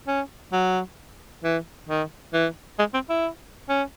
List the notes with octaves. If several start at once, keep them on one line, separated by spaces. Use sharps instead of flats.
C#4
F#3
E3
D#3
E3
G#3
C4
E4
C#4